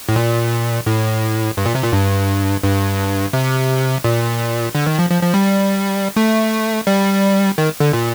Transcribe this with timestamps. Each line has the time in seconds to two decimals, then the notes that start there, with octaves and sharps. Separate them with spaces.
0.09 A2
0.16 A#2
0.86 A2
1.57 G2
1.66 A#2
1.75 C3
1.84 A#2
1.93 G2
2.63 G2
3.33 C3
4.04 A#2
4.75 D3
4.87 D#3
4.99 F3
5.10 F3
5.23 F3
5.34 G3
6.16 A3
6.87 G3
7.58 D#3
7.80 D3
7.93 A#2